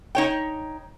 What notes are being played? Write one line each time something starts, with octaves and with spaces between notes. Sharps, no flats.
D#4 C#5 G5